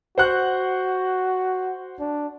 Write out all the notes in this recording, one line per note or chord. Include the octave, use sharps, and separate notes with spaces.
F#4 C5 F#5 F#6
D4